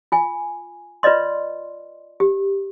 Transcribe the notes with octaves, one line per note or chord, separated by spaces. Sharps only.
F4 G#5
F4 B4 D5 D#5 C6
G4